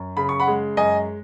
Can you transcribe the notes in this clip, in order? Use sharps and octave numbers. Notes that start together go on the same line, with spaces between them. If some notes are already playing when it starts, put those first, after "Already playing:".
Already playing: F#2
C#3 B5
C#6
F#5 B5
G#3
F#2 D#5 G#5